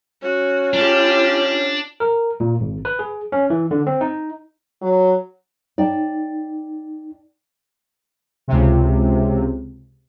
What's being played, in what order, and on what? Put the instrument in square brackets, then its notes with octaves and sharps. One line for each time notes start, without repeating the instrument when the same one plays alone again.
[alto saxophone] C#4 [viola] F#4
[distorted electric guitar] D4 [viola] F4 G4
[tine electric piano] A#4
A#2
G#1
B4
G#4
C#4
E3
D3
C4
D#4
[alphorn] F#3
[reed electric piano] D#4 [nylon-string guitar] D5 G5 A5
[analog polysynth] C#2 C3